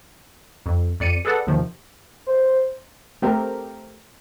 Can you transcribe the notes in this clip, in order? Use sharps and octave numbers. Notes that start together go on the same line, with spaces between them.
F2
F2 D5 C#7 D#7
G#4 A4 B4 D5 F#5 A5
D#2 C3 D#3 F3
C5
A3 C4 G4 A#4